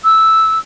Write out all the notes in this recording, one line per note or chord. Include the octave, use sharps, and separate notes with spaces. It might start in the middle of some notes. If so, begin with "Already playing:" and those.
E6